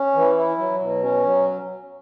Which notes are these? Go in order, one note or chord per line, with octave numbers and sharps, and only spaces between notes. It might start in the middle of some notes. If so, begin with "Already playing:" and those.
Already playing: C#4
E3
E4
F#3
B2
C#4
F#3